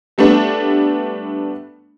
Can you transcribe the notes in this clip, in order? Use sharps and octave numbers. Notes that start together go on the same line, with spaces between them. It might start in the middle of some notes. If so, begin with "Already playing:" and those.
G3 A3 B3 D4